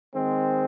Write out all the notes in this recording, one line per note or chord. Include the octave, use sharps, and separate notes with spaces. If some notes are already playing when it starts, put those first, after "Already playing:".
D#3 G#3 C4